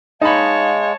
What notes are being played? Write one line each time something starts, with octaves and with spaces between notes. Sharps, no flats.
G#3 D#4 C#5 F5 A5 B5